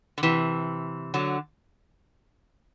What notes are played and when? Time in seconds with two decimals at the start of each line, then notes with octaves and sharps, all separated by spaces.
0.18 D3
0.23 C3 E3
1.14 D3 F#3